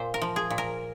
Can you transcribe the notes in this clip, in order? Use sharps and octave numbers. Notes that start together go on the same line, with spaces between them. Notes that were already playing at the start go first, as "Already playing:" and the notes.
Already playing: A#2 C5
A#4
F3
G#4
A#2
A#4